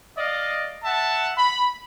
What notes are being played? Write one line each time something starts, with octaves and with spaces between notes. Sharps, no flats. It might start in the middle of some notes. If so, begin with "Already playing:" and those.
D5 D#5 F5
E5 F#5 A5
B5